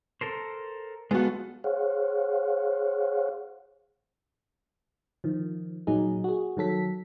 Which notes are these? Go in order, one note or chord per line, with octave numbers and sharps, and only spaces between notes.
A4 A#4 C5
G#3 B3 F4 F#4 A4
G#4 C5 C#5 F5 F#5
D#3 F3
A#2 F#3 D#4 G#4
F#4 G#4
D#3 F#3 A4 B6